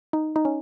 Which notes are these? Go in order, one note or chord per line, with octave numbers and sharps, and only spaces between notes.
D#4
D#4
C#4